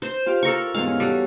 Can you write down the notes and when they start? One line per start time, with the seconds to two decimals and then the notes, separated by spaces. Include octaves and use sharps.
0.02 C5 C6
0.26 F4 G4 F5
0.43 A4 A#4 C#6
0.74 E2 G#2 F5
0.87 C#4
1.00 G3 F#4 A4